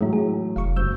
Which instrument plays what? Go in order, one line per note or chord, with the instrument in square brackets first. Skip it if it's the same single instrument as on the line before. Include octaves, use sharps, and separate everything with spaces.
[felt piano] A2 E3 F#3 [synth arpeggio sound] G#3 A3 E4
[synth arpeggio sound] G#4
[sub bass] F1 [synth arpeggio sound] F5 C#6
[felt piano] F#1 [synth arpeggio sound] E6 G6